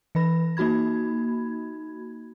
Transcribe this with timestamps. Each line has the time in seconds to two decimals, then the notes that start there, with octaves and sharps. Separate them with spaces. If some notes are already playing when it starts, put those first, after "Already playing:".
0.15 E3 B4 B5 A#6
0.57 A#3 D#4 F#4 B5 G#6